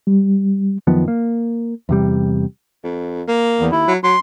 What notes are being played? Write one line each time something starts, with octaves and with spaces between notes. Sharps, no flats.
G3
F#2 D#3 F3 B3
A#3
E2 C3 G3
F2
A#3
E2
D#2 E4
F#3
F#3 C6